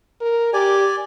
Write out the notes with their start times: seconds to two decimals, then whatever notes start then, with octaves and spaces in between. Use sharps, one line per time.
0.21 A#4
0.53 G4 D5 G#5